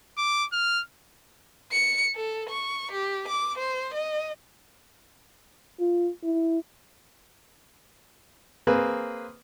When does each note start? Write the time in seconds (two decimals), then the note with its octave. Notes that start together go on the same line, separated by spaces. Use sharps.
0.18 D6
0.53 F6
1.72 C#7
2.16 A4
2.50 C#6
2.92 G4
3.28 D6
3.58 C5
3.94 D#5
5.80 F4
6.24 E4
8.67 A#3 C4 G#4 B4